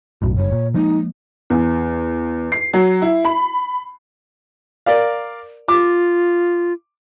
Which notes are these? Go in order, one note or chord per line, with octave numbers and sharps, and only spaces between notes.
B1 F#2 A2 F#4
F#1 G2 C#5
A#2
F3 G#3 A#3 D#4
E2
C7
F#3
E4
B5
A#4 D5 F5
F4 D6